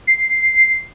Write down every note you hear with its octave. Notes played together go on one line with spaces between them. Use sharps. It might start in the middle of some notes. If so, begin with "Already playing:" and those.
C7